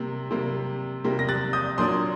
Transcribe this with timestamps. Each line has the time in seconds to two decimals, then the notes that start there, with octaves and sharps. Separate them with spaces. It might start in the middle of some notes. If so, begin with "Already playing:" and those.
Already playing: C3 G3 A#3
0.31 C3 G3 A#3
1.04 C3 G3 A#3
1.19 A#6
1.29 F#6 A6
1.53 D#6 G6
1.77 A#2 F#3 A#3 D4 C6 D#6